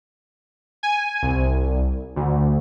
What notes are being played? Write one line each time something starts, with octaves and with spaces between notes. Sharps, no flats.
G#5
C2
D2